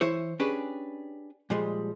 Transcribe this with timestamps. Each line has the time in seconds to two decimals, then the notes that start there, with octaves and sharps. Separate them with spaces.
0.01 E3 E4 C5 C#5
0.40 C#4 D4 G4 G#4 B4
1.50 A#2 F3 G3 G#3